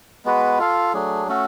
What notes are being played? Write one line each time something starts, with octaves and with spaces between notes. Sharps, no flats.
G#3 B3 F#4 B4
F4 A4 F5
F#3 A3 D4 G#4
A3 C#4 F#4 A4